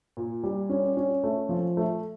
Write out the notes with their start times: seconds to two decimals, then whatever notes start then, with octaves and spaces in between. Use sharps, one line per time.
0.17 A#2
0.43 G3
0.69 C#4
0.97 C#4
1.23 A3
1.49 F3
1.77 A3